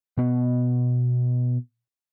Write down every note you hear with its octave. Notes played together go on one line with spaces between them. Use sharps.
B2 B3